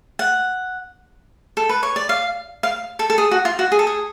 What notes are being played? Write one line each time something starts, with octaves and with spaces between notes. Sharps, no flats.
F#5
A4
B4
C#5
D5
F5
F5
A4
A4
G#4
F#4
F4
F#4
G#4
A4
G#4